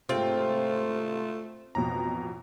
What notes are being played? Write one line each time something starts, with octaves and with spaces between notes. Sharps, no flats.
G#2 C3 A3 C4 F4
A1 F2 B2 A#5